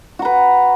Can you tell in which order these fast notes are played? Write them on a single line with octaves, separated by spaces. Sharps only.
F#4 A#5 B4